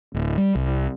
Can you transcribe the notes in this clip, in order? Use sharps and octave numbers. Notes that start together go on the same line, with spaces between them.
D1
G3
C2